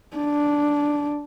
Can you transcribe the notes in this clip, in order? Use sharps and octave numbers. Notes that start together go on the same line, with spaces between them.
D4